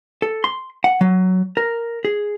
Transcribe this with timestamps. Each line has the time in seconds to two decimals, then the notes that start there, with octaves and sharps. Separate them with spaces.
0.22 A4
0.44 C6
0.84 F#5
1.01 F#3
1.57 A#4
2.05 G#4